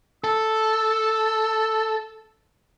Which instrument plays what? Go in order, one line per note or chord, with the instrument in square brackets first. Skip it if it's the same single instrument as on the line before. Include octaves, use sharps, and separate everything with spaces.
[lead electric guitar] A4 [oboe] E6